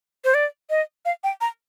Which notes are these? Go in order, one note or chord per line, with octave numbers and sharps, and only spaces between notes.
C5
D5
D#5
F5
G5
A#5